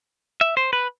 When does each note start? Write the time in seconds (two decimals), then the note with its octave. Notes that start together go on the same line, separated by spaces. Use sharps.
0.41 E5
0.57 C5
0.73 B4